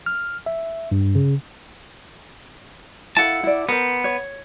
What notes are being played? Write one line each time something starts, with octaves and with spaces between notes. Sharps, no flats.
F6
E5
G2
C#3
E4 A4 F5 F#5 A5
E4 D5
B3 A#4 C5
C#5